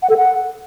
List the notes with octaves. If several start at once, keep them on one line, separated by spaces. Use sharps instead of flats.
F#5
A4
F#5